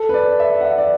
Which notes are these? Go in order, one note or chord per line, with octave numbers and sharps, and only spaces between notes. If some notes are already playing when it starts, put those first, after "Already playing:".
Already playing: A4
B4
D5
E5
F#5
E5
D5